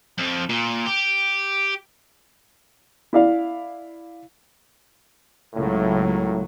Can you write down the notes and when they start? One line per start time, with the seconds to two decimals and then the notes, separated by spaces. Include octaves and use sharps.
0.18 F2 F3
0.49 A#2
0.86 G4
3.13 E4 D5 F5
5.55 C#2 A2 F#3 A#3